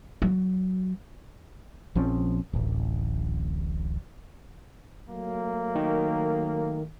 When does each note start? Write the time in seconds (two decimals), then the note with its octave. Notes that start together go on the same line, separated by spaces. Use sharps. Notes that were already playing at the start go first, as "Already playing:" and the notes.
0.22 F#3
1.95 A#1 F3 C4 C#4
2.53 D1 A1
5.09 F#3 A3 A#3
5.75 D#3